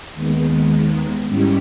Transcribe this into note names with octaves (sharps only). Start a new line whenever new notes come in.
D#2 D#3 G#3 B3
G#2 G3 C#4 E4 G4